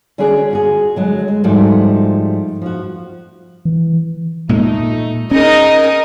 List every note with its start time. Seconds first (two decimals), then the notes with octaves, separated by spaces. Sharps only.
0.18 D3 C#4 D4 F#4 G#4 D5
0.51 F4 F#4 G#4
0.96 D3 F#3 G#3
1.28 G#3
1.44 G#2 F3 G3 A3 F#4
2.62 F3 F#4
3.65 E3
4.49 A#2 G#3 A3 D#4
5.31 C#4 D#4 G#4 A#4 D#5